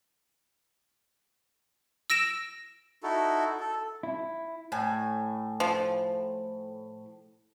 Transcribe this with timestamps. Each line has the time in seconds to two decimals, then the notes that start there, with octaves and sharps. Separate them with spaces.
2.10 E6 A#6 D7 E7
3.03 D#4 E4 F#4 A4
3.60 A4
4.03 E4
4.72 A2 G#5
5.60 F3